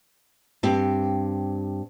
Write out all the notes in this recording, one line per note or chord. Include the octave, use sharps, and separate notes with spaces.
G2 C4 G4